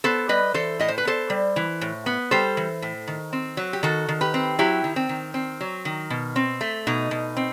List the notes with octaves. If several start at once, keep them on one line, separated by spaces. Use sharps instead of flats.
B3 A4 C5
G3 B4 D#5
E3 A4 C5
A2 D#5
C5
B4
B3 A4 C5
G3
E3
A2
B3
G3 A4 C5
E3
A2
D#3
C4
F#3
G4
D#3 F#4 A4
D#3
G4 B4
C4
F#3 E4 G4
D#3
C4
D#3
C4
F#3
D#3
B2
C4
A3
B2 D#4
B2
C4